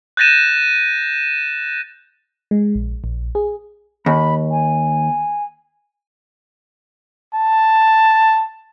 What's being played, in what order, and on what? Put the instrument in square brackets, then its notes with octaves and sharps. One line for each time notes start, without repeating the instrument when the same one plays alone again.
[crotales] F#6 G6 A6 A#6 D#7 E7
[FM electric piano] G#3
A#1
A#1
G#4
[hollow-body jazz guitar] D#2 [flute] B5
[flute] G#5
[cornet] A5